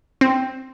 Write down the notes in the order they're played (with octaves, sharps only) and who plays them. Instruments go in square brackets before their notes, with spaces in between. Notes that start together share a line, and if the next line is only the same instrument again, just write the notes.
[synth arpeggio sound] C4